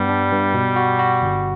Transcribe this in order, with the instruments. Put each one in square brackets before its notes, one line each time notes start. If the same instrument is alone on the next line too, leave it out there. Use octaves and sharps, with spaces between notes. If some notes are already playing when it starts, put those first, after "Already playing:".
Already playing: [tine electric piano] G2 B3 [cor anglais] G3
[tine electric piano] D4
G2
B2
F#4
F#4
G1